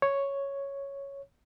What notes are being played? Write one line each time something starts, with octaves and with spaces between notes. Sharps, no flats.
C#5